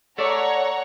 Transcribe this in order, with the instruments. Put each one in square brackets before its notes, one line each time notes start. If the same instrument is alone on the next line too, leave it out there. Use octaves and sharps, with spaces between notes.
[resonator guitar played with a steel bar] A3 A4 D5 [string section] C#5 F#5 A#5